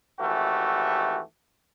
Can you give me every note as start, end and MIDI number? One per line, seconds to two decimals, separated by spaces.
0.19 1.20 32
0.19 1.20 52
0.19 1.20 57
0.19 1.20 66
0.19 1.20 67